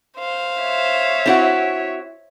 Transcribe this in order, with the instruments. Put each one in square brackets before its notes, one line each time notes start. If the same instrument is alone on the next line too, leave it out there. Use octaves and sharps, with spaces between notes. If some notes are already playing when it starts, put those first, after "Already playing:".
[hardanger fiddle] C5 F5
[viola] C#5 E5
[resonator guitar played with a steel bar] C4 E4 F#4